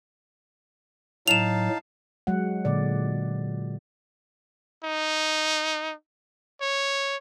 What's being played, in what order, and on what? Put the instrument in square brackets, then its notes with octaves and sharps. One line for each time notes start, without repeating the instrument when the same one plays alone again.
[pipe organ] A2 F#3 [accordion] D#4 F5 A5 [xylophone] E7 F7
[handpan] F#3 G#3 F#5
A#2 D3 D5
[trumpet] D#4
C#5